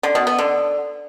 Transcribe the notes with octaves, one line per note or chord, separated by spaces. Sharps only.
D3
B2
B3
D3